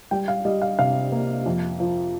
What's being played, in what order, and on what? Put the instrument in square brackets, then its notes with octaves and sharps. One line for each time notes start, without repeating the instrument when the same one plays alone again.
[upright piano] G3 G5
F5
G3 D#5
F5
C3 F5
A#3
F2
F3